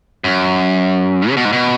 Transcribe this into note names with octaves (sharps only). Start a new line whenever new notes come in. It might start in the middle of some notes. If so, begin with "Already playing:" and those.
F#2
C#3
B2
G#2
B2